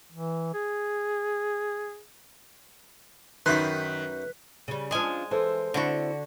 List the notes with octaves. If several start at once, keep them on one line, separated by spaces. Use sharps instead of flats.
E3
G#4
F#2 D#3 D#4 B4 C6 B6
C#3 G3
F3 G#3 C#4 D4 G#5
E3 A4 C5
D3 C4 E4 F#4